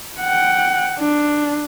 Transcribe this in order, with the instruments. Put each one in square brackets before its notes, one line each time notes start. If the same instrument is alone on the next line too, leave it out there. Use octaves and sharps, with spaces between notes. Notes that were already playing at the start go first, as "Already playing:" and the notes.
[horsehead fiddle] F#5 G5
D4